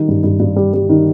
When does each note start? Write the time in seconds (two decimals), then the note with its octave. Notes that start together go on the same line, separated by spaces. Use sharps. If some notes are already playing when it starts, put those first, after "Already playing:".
Already playing: D#3 G3
0.08 G2
0.24 G2
0.40 G2
0.56 G3
0.74 G3
0.89 D#3